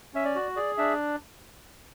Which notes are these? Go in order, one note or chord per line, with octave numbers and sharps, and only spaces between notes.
C#4 E5
D5
F#4
G#4 D5
D4 E5